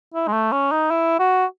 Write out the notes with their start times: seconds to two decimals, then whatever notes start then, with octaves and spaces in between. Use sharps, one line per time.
0.14 E4
0.27 G#3
0.33 A3
0.52 C#4
0.71 D#4
0.91 E4
1.19 F#4